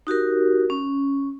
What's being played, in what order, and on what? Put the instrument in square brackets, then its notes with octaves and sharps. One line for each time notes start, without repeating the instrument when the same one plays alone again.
[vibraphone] D#4 F#4 G4 A#4
C#4